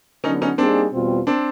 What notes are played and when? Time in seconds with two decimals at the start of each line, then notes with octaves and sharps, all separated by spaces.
0.24 D3 F#3 B3 C#4 D#4
0.42 C#4 D#4
0.58 G3 A#3 C4 D4 D#4 G#4
0.93 E2 B2 G3 C4 F4
1.27 C4 D4